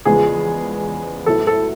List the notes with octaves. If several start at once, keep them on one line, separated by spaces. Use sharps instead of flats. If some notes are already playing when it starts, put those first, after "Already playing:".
E2 C#3 F3 G#3 B3 G#4
A2 F#3 B3 E4 A4
A4